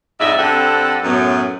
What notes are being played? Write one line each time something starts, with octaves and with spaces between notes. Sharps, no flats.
F2 G#2 D5 E5
F2 D3 C4 G4 A4 F#5
F#2 A2 B3